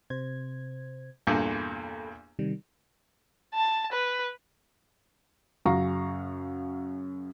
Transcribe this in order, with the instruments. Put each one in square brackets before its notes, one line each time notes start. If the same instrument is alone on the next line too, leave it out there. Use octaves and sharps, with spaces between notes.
[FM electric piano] C3 C5 G#6
[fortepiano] E2 G2 A#2 [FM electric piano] A4 B5
[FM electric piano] C3 D#3 G3
[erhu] A5
B4
[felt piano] F#2 C#3 F#4 F5 A#5 C#6